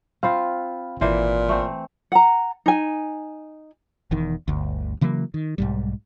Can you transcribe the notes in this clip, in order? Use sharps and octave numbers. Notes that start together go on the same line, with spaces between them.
C4 F4 F5 B5
G#1 A#2 E3 C5
A3 C4
F#5 A#5
D#4 G#5
E1 E2 D#3
G1 D2
C#3 E3 F#3 A#3
D#3
B1 G#2 G3